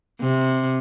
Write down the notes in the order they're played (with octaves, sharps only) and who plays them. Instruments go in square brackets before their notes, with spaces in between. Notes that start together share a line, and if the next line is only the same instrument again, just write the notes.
[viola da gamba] C3